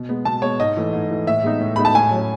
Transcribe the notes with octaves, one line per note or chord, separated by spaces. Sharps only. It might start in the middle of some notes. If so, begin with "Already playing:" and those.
Already playing: B2
G#3 B3
B2 A5
G#3 B3 C#5
G#2 D#5
E3 A3
G#2
E3 A3
A2 E5
G#3 B3 D#4
A2
G#3 B3 D#4 B5
A5
A2 G#5
F#3
C#4